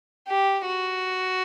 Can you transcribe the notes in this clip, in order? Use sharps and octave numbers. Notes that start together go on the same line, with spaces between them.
G4
F#4